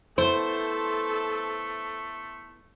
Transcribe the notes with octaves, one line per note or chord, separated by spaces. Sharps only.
A3 B3 E4 A4 C5